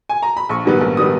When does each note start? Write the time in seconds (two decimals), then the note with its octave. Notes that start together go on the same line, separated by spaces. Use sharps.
0.09 G#5
0.23 A#5
0.37 B5
0.49 A#1 C#6
0.65 G#2 D#3 G3 B3
0.81 A#1
0.97 D#3 G3 B3 D#6